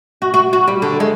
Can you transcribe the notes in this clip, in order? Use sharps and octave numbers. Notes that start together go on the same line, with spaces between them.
F#4
F#4
F#4
G3
D3
G#3